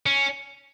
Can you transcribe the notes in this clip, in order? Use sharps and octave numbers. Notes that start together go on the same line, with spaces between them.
C#4